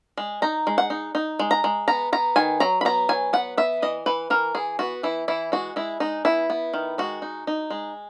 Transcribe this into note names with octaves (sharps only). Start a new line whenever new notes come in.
G#3
D#4 A#5
G#3
F#5
D#4
D#4
G#3
A#5
G#3
B3 A#5
B3 A#5
D#3 G#5
F#3 A#5
B5
B3 A#5
F#3 G#5
B3 F#5
B3 E5
E3 D#5
E3 B4
E3 A#4
E3 G#4
B3 F#4
E3 E4
E3 E4
G#3 F#4
G#3 E4
G#3 D#4
B3 E4
B3
D#3
G#3 F#4
D#4
D#4
G#3